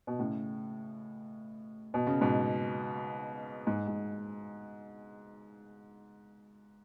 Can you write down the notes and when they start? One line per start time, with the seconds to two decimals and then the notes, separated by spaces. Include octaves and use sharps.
0.07 B2
0.19 A2 C#3
1.94 B2
2.07 C#3
2.21 G#2 B2
3.67 G#2
3.88 G#2